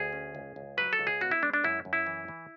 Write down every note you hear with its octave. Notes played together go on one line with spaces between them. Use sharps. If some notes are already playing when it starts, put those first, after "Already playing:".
Already playing: D2 G#4
C#4
C#2
C#2
F#3 B4
A4
C#2
G#4
B3 F#4
E4
G#3 D4
D4
F#2 E4
F#2
E4
E3
E3